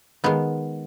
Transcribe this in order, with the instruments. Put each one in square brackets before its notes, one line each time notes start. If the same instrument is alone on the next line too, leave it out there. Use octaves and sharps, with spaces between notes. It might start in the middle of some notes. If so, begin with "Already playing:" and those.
[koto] D#3 G#3 B3